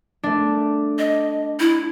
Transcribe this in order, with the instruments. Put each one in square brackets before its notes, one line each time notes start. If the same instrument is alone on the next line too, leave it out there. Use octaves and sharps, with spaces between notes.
[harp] A3 D4
[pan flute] D#5
E4